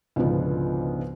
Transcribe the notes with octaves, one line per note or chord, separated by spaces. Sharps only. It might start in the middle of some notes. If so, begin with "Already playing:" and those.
C#2 G#2 B2 D3 F3 B3